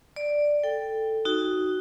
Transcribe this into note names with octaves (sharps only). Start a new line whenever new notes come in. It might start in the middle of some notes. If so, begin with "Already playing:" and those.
D5
A4 G5
D#4 F#4